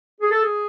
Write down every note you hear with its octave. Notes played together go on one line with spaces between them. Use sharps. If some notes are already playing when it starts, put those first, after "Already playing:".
G#4
A4
G#4